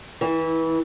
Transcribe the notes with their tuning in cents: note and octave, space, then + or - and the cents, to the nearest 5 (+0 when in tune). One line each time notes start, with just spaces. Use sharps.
E3 -25